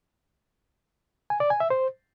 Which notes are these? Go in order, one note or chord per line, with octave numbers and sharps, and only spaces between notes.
G#5
D5
G#5
E5
C5